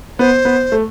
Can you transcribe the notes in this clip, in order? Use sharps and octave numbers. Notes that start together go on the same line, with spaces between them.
B3 C5
B3
A3